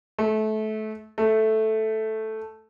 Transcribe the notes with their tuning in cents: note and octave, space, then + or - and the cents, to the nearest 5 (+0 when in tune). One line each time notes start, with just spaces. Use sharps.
A3 -25
A3 -5